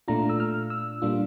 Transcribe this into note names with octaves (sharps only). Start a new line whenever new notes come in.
A#2 A3 D4 F4 A#5
E6
F6
E6
A#2 G3 A#3 D4 F4